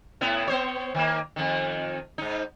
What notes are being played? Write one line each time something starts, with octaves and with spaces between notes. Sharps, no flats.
A2 B3 E4
B3 C5 C#5
D#3 A#3
F2 D#3
G#2 D#4